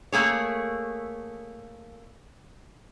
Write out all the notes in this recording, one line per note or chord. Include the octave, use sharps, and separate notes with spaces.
A3 A#3 G#4 C#5